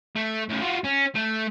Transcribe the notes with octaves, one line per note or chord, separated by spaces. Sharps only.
A3
A2 C#3
F4 F#4
C#4
A3